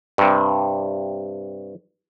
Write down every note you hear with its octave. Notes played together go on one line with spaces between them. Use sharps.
G2 C3